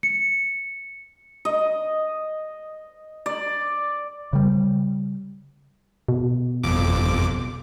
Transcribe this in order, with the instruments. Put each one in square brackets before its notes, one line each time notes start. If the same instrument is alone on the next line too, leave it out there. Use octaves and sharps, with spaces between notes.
[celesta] C#7
[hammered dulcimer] D#5
D5
[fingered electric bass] C#3 G3
[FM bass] B2
[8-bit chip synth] G1 F2 D6